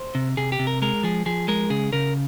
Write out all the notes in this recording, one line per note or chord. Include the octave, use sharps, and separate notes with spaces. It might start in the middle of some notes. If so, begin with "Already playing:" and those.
Already playing: C5
C3
C3 G#4
G4
C3
A#4
G#3 A#4
F3 G#4
F3 G#4
G#3 A#4
C#3 G#4
C#3 A#4